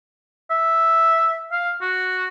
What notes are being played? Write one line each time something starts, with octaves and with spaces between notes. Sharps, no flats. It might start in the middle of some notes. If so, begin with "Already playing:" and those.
E5
F5
F#4